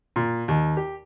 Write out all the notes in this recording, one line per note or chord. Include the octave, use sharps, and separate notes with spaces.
A#2
D#2
G4